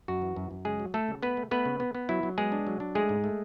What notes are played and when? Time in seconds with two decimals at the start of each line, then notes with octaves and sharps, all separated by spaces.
0.08 F#2 F#4
0.22 E3
0.36 F#2
0.51 F#2
0.65 C#3 G#3 G#4
0.80 F#3
0.94 A3 A4
1.08 C#3
1.22 A3 B3 B4
1.37 A3
1.51 A3 B3 B4
1.65 C#3
1.80 B3
1.95 B3
2.09 F#3 E4
2.23 F#3
2.38 G#3 B3 G#4
2.52 D4
2.67 F#3
2.80 D4
2.95 G#3 A3 G#4
3.09 G#2
3.24 A3